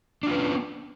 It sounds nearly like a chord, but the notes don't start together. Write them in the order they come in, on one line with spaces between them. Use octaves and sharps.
D4 F4 B4 C#4 B3